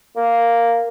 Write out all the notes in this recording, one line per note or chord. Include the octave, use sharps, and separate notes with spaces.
A#3